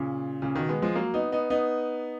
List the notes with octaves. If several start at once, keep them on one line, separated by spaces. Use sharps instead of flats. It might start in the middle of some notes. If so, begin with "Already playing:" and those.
Already playing: A#2 C#3
A#2 C#3
B2 D#3
G#3 B3
F3 G#3
F#3 A#3
B3 D#4
B3 D#4
B3 D#4